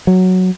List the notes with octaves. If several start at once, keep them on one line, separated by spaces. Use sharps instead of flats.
F#3